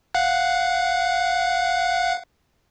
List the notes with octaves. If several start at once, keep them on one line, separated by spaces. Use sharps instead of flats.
F5 F#5 F#6